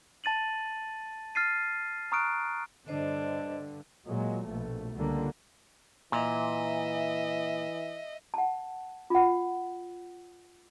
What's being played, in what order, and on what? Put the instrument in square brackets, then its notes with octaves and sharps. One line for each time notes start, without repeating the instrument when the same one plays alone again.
[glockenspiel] A5 A6 D#7 F#7
F6 A6 C7 D#7
A#5 C#6 D#6 F6 F#6 D7
[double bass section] G2 D3 [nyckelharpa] D4 [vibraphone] C5 D#5
[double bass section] A#2 F#3 G#3
A#1 B2 A3
C#2 D3 G3 A#3
[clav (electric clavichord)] A#2 [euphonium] E3 [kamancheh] D#5 E5
[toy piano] F#5 A5
F4 F#5